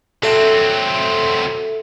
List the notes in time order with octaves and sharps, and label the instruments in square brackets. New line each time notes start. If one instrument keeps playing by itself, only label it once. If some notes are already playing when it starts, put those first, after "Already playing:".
[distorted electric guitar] F#3 C4 [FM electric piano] A4 E5